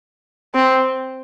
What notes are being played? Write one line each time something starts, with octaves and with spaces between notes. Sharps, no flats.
C4